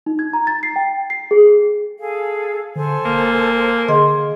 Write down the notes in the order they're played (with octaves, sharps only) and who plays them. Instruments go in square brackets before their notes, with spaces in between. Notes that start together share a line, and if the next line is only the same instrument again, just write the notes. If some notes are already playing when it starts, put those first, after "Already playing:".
[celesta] D#4
G#6
A#5
A6
C7
G5
C7
G#4
[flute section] G#4 A4 F5
[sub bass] D3 [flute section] A4 C5 G#5
[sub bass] E1 [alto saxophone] A#3
[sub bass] D3 [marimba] G#4 D#5 C6